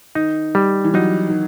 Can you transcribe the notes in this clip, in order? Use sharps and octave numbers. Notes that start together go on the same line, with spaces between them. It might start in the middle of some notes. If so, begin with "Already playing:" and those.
D#3 D#4
G3
E3
F#3 D#4
D#3